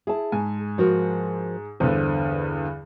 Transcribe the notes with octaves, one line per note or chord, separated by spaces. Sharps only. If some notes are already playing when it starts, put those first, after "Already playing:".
E4 G#4 A5
G#2 G#5
F3 F#4 A#4
E2 G2 D3 C5